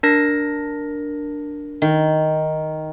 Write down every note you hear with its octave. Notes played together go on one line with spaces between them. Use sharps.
D4 A#4 A#6
D#3